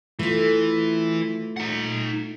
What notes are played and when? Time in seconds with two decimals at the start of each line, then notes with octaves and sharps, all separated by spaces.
0.19 E3 A3 F4
1.57 D#4 F#5